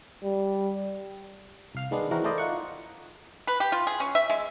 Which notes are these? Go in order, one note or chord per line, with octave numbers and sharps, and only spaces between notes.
G3
C2 F5 F6
D#3 G#3 B3 D4
E3 G#3 C4 F#4 A#4
A3 E4 A#4 C5 D5 D#5
D#4 F4 F#5 C#6
B4
G4
F4
G#4
C#4
E5
G#3